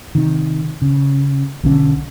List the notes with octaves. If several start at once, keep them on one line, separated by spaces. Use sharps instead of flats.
C3 D#3
C#3
B1 D3 C#4